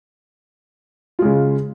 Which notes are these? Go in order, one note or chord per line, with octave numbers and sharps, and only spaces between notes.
C#3 G#3 F4